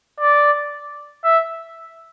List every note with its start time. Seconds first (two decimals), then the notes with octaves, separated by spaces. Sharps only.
0.20 D5
1.24 E5